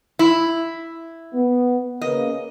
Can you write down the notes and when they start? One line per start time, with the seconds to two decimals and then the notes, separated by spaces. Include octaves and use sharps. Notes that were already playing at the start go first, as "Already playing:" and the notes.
0.19 E4
1.33 B3
2.01 C#3 A#3 B4 D#5